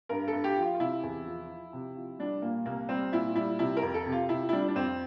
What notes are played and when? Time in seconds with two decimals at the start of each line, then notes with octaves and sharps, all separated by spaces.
0.09 G2 A#4
0.28 A4
0.33 G2
0.44 G4
0.57 F3
0.62 F4
0.75 F4
0.80 C3 E4
1.03 E2
1.26 F3
1.50 F3
1.73 C3
1.96 F3
2.19 G3 D4
2.42 A#2 A#3
2.66 C2 A#3
2.89 G3 C4
3.12 A#2 E4
3.36 G3 E4
3.59 C3 E4
3.77 A#4
3.82 F2
3.94 A4
4.06 C3
4.12 F4
4.29 C3 E4
4.49 E4
4.53 G3 D4
4.68 D4
4.75 F2 C4